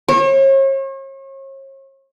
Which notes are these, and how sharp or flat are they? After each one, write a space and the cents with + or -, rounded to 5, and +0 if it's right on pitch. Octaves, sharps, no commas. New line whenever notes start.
C#5 -40